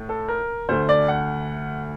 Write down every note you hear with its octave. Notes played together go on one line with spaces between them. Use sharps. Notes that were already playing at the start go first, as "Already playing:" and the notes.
Already playing: A2 A3
A4
A#4
D2 D3 A3 C5
D5
F#5